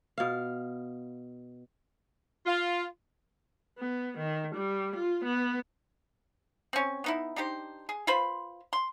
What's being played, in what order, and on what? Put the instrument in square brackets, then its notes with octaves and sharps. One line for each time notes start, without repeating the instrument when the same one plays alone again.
[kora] B2 F5
[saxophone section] F4
[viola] B3
D#3
G3
F4
B3
[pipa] C4 C#4
B3 D#4 E4
D4 D#4 G4 C5
G#4
F4 B4 C5 B5
C6